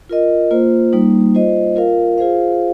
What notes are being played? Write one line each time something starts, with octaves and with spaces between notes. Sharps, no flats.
F4 A#4 D#5
A#3 F4 C5
G3 A#3 D#4
F4 C5 D#5
F4 A#4 F5
F4 G#4 C5 F5